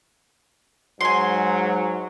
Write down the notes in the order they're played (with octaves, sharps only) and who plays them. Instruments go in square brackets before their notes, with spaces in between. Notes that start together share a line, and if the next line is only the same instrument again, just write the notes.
[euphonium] G#2 [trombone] F#3 [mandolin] G#5 C6